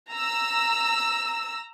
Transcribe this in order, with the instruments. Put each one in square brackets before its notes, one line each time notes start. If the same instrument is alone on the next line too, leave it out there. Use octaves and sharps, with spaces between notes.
[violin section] A#5 E6